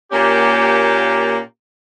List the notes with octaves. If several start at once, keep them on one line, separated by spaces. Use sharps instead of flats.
A#2 A#3 C#4 G4